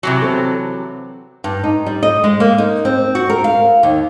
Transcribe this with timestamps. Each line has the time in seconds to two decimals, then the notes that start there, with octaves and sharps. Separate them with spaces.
0.03 C3 E3 F#3
0.22 C4 A4
1.44 G2
1.64 D#4
1.86 G3
2.03 D#5
2.24 G#3
2.40 A#3
2.58 D#4
2.85 C4
3.15 F#4
3.30 A#4
3.44 F5
3.83 D#2